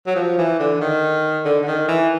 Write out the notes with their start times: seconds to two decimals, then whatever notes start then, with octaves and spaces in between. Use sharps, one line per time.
0.06 F#3
0.16 F3
0.38 E3
0.59 D3
0.81 D#3
1.45 D3
1.63 D3
1.67 D#3
1.88 E3